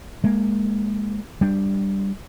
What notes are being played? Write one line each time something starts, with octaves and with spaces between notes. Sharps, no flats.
G#3 A#3
G3 D4